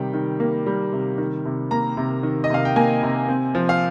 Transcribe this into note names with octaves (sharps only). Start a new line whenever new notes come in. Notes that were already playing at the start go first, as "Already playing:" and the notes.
Already playing: C3 D#3 G3 G5
D#3
A#3
G3
C3
D#3
C3
A#3 A#5
C3
D#3
D#5
C3 F5
G5
A#3 G#5
C3
C4
F3
F5